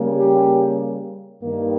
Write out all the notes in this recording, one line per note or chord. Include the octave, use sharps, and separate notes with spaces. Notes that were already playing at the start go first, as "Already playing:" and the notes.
Already playing: C#3 G3 A#3
G4
G2 D#3 A#3